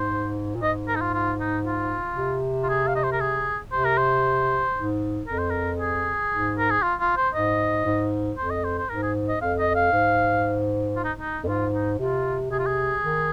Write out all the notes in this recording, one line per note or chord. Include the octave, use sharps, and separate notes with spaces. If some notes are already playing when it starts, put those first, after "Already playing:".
Already playing: G#2 C5
A#2
G#2 D#5
A#4
D#4
F4
F4
D#4
F4
C3
F4
G#4
F5
D#5
C5
A#4
G#4
C3 C5
A#4
C5
G#2
F2 A#4
C5
A#4
G#4
G#2
A#4
G#4
F4
F4
C5
G#2 D#5
G#2
F2 C5
D#5
C5
C5
G#2 A#4
G#4
D#5
F2 F5
D#5
F5
G#2
F4
D#4
D#4
F2
G#2 F4
D#4
C3 F4
C3 G#4
F4
G#4
D#3